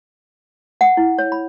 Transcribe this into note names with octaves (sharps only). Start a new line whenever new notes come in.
F#5
E4
C#5
B5